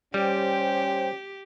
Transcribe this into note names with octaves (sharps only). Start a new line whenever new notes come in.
G3 C#4 G4 C5 G5